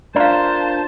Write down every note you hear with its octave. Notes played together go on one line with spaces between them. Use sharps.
D4 F4 A#4 C5 D5 F5 A5